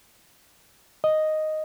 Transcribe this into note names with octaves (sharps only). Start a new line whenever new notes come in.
D#5